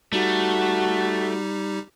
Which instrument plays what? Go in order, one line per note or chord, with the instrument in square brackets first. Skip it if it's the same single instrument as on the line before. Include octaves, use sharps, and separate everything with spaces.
[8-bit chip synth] G3 D#4 G4 [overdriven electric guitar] A3 [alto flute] F#4